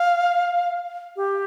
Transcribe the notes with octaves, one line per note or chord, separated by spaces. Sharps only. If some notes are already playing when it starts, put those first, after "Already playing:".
Already playing: F5
G4